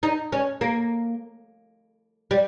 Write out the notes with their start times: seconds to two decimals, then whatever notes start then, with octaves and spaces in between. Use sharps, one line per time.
0.03 D#4
0.32 C#4
0.61 A#3
2.31 G3